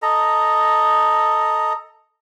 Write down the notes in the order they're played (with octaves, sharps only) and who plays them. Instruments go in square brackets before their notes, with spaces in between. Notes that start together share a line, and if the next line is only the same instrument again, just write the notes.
[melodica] A4 D#5 A#5